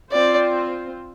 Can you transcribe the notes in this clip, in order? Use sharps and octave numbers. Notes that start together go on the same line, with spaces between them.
C4 F4 C5 D5